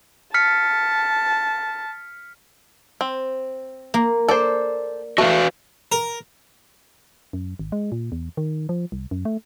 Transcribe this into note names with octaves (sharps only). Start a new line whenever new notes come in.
A5 F6 B6 C#7
C4
A#3
A4 C5 D5
A3 F#4 B4 F5
A#4
F#2
G#1
G#3
A#2
E2
D#3
F3
C2
F#2
A3